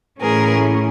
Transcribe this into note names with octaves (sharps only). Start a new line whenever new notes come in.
A2 E3 A3 C#4 G#4 A#4